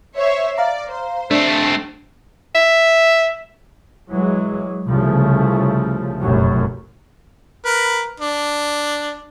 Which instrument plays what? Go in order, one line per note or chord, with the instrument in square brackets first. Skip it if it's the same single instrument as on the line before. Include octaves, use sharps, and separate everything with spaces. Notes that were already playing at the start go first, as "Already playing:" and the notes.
[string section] C5 C#5 E5
[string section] D5 [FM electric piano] F5 A#5
[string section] C5
[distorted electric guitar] A3 C4 [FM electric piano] D4
[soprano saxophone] E5
[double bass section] E3 F#3 G#3
C2 C#3 F3 A3
F1 B1 F#2 F#3
[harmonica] A#4 B4
D4